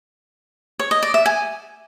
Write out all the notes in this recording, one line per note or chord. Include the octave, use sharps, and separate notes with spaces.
C#5
D#5
D5
E5
G#5